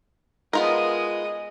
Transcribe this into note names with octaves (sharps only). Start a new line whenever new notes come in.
G#3 B3 F4 A#4 D#5